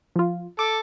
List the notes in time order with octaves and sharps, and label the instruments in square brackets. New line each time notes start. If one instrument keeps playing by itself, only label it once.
[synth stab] F3 F4
[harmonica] A4 [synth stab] D6